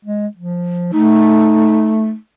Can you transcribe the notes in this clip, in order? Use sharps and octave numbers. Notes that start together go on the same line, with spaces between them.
G#3
F3
A3 D#4